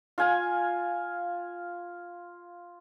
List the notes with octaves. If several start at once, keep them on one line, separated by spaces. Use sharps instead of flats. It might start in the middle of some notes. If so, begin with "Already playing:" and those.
F4 F5 G#5